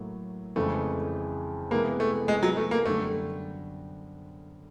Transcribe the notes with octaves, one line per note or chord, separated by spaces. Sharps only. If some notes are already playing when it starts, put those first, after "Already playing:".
Already playing: A2 F#3 A#3
F2 C#3 E3 G#3 A3
C3 E3 G#3 A#3 B3
A3
G#3
F#3
A3
A#3
F#2 D3 G3 A3